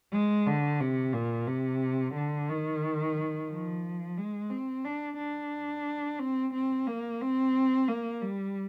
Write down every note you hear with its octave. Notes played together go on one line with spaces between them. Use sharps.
G#3
D3
C3
A#2
C3
D3
D#3
F3
G#3
C4
D4
D4
C4
C4
A#3
C4
A#3
G3